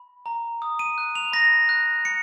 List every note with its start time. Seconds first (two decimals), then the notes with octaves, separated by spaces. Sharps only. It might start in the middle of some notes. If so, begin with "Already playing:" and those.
Already playing: B5
0.26 A#5
0.62 D#6
0.79 D#7
0.98 F#6
1.15 F7
1.32 B5 A#6
1.69 F#6
2.05 B5 C#7